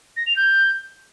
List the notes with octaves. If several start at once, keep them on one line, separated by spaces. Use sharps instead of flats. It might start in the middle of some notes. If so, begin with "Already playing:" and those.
A#6
F7
G6